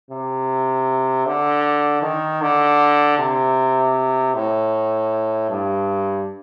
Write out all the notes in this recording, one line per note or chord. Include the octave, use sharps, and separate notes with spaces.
C3
D3
D#3
D3
C3
A2
G2